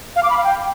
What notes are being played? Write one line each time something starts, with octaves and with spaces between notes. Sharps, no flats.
F5
D6
B5
F5
G5